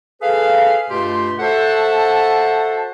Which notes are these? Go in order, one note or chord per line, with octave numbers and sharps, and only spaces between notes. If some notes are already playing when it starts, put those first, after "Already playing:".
G#4 A4 B4 F5
G2 B2 A3 F4 G4 C6
F#4 A4 C5 E5 F#5 A5